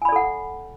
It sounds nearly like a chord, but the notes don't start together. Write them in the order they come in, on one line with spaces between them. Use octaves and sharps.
G#5 B5 D5 A4 F#5